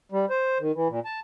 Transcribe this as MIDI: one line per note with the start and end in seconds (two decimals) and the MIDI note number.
0.12 0.25 55
0.30 0.58 72
0.60 0.72 51
0.75 0.88 52
0.89 1.00 46
1.05 1.20 81